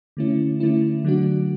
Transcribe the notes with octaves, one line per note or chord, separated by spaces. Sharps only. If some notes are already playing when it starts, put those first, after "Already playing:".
D3 A3 C#4 E4
D3 A3 C#4 E4
D3 F#3 A3 D4 F#4